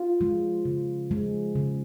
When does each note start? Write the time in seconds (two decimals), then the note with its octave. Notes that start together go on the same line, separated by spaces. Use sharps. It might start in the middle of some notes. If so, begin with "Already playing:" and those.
Already playing: F4
0.21 F3 G#3
0.65 C#3
1.11 F3 G#3
1.56 C#3